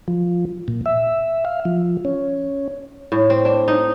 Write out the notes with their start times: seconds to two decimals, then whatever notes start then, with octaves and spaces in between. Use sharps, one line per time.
0.08 F3
0.68 A#2
0.86 E5
1.45 F5
1.65 F3
2.05 C#4
3.12 A2
3.30 C4
3.45 D4
3.68 D#4